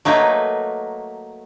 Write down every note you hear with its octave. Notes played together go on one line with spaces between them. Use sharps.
F#3 A3 A#3 D#4 B4